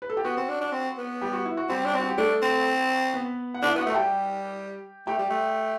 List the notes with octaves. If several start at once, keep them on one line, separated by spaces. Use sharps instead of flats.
B4
A4
G4
B3 F#4
C4
D4
D4
C4
B3
G3 G4
F#4
E4
F#4
G3 C4 G4
D4
C4 F#4
G4
A3 D4 A4
C4
B3 B4
F#5
D4 E4 E5
B3 F#4 F#5
A3
A5
G3 G4 G5
A3 G4 G5
G3
A3